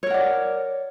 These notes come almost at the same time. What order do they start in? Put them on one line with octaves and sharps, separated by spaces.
C#5 A#4 F#5 D5